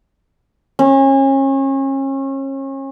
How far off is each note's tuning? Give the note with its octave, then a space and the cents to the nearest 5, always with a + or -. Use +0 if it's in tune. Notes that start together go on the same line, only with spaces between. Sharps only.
C#4 -35